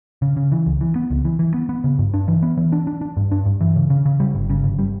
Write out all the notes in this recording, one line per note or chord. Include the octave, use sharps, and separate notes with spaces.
C#3
C#3
E3
C#2
E3
B3
C#2
E3
E3
B3
B3
C#3
G2
D4
E3
B3
E3
D4
D4
D4
G2
D4
G2
E3
C#3
C#3
C#3
G3
G1
C#3
G1
G3